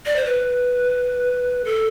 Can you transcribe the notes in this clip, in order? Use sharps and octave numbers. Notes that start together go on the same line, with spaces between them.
D5
C5
B4
A4